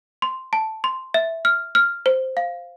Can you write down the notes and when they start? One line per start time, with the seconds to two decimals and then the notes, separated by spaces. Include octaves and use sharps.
0.22 C6
0.53 A5
0.84 C6
1.14 E5
1.45 F6
1.75 F6
2.06 C5
2.37 F5